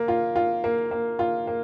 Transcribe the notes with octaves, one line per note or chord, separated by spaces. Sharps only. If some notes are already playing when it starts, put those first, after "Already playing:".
Already playing: A#3
F4
F4
A#3
A#3
F4
A#3